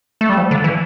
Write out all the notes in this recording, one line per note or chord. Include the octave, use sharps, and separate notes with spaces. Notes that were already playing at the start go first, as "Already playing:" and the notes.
A3
G3
F3
D3
E3